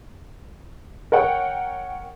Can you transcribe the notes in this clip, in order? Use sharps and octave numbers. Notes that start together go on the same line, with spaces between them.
A#4 C#5 F#5 G5